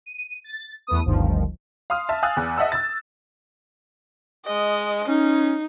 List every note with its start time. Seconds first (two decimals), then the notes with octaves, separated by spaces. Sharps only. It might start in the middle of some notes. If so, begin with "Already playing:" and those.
0.06 D#7
0.44 A6
0.87 E2 A3 B3 D#6
1.05 G1 D2 G2 D#3 F3
1.90 F5 C6 D#6 F6
2.09 E5 A5
2.23 F5 G#5 D#6 E6 F#6 A6
2.37 E2
2.58 D#5 E5 F#5 A5 E6
2.72 E6 A6
4.46 G#3 D#5
5.07 C#4 D#4